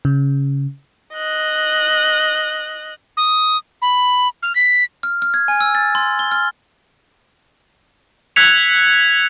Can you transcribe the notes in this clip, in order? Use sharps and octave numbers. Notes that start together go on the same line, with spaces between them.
C#3
D#5 F#6
D#6
B5
F6
B6
F6
F6
G#6
G#5
E6
A6
C6
G7
F6
E6 F#6 G#6 B6 C#7 F7